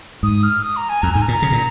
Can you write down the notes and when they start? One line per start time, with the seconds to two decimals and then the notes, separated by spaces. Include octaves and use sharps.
0.23 G#2 D#6
0.43 F6
0.63 D#6
0.76 A#5
0.89 G#5
1.02 F2 A#5
1.12 G#2 G#5
1.22 A#5
1.28 A#2
1.32 A#5
1.42 C#3
1.52 A#2